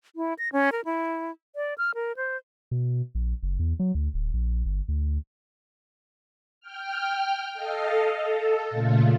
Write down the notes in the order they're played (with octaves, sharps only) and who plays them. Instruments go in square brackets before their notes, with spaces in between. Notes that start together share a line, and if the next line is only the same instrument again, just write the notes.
[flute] E4
A#6
C#4
A#4
E4
D5
F6
A#4
C5
[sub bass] B2
A#1
F#1
E2
F#3
D2
D1
A#1
G1
D2
[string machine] G5 F6
A4 D#5 F5
A4
A#2 C#3 A3 F4